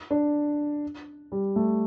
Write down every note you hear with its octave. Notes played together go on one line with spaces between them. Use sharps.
D4
G3
A3